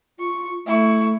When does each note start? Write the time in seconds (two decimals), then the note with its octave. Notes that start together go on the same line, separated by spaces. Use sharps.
0.19 F4 C#6
0.66 A3 E4 C#6